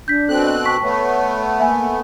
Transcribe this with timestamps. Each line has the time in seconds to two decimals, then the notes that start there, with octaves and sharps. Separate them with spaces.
0.08 D4 G6 B6
0.29 B2 C4 A4 F#6
0.66 A5 C#6 B6
0.83 A3 B3 C#5
1.60 A#3 E5 G#5